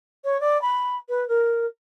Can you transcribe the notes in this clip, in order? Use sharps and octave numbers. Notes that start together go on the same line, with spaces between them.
C#5
D5
B5
B4
A#4